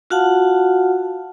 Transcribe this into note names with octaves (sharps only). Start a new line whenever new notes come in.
F4 F#4 F5 F#5 A5